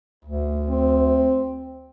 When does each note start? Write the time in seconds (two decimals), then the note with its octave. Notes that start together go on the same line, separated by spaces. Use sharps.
0.24 D2
0.69 C4